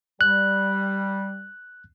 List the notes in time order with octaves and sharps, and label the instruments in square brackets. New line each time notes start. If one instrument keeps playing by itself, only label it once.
[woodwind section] G3 [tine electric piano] F#6